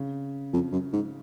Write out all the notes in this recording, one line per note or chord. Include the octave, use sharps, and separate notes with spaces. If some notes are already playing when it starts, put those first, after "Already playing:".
Already playing: C#3
F2
F#2
G#2